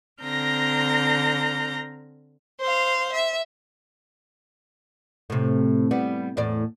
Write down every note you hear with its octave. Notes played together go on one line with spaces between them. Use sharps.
D3 C4 A#5 F6 G6 A#6
C5 F5
E5
A2 C3
G3 B3
E2 A2 D5